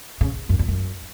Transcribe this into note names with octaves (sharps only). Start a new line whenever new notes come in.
C#3
F#2
E2
F#2